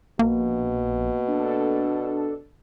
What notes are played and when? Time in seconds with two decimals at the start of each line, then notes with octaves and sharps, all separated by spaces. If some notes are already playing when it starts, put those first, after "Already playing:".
0.19 A#1 B2 A#3
1.28 D4 A4